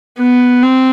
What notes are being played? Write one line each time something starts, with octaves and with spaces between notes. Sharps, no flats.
B3
C4